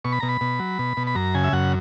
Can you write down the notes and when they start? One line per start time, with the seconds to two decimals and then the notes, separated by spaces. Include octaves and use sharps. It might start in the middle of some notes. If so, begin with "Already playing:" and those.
0.05 B2 C#6
0.12 B5
0.20 B2 A#5
0.29 B5
0.41 B2
0.59 F#3
0.79 B2
0.97 B2
1.07 B5
1.15 F#2 A#5
1.34 C#3 G#5
1.44 E5
1.53 F#2 F#5